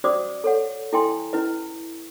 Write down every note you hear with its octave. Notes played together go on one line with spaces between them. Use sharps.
C#4 F#4 C5 D5 D6 D#6
A4 C#5 F#5
E4 A4 D#5 G5 G#5 C6
C#4 E4 B4 D#5